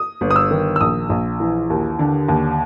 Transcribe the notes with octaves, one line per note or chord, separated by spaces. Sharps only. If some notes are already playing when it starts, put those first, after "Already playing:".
Already playing: D#6
G1
D#6
E6
D#3
E6
A#1 D#6
A#1
E3
D#2
D3
D#2